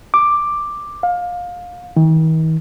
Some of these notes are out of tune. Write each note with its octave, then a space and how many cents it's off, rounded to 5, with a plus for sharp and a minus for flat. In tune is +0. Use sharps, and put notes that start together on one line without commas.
D6 +5
F5 +25
D#3 +45